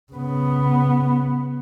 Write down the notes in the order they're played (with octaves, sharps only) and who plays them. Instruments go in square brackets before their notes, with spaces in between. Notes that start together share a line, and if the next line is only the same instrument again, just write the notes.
[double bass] C#3 B3